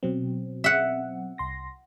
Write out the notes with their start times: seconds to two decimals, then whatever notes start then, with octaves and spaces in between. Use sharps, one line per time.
0.03 B2 F#3 C4
0.64 E5 F#5
1.38 C2 C6 A#6